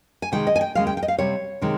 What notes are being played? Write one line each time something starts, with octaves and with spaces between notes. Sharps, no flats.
G#5
C3 D#3 G#3 G5
D#5
G#5
G5
D#2 C#3 G#3 F5
G5
G5
D#5
F5
C3 G3 C4 C#5
C3 D#3 G#3 C4